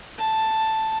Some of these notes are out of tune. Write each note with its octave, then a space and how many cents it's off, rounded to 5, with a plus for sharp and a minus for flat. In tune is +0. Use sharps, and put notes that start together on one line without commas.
A5 +5